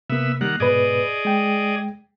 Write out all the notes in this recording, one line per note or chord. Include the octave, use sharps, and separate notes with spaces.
C3 A#3 B3 E5
D#3 G3 A#3 F#5
G#2 B2 G#4 B4 D5 D#5
G#3 G5